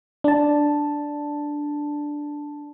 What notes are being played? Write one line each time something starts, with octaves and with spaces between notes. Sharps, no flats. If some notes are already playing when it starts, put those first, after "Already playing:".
D4 A5